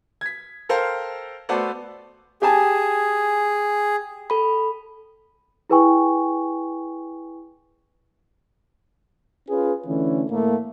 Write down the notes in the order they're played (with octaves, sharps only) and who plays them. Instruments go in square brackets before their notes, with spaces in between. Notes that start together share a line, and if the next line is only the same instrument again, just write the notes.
[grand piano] G#6 B6
A4 A#4 C5 F5 G5
A3 B3 F#4 A4 C5 D5
[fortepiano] G4 G#5 A5 [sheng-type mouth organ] G#4
[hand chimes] A4 B5
[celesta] E4 G#4 B4 G5 G#5 C#6
[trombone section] C#4 F4 G#4 B4
D3 E3 A3 C#4
A2 A3 A#3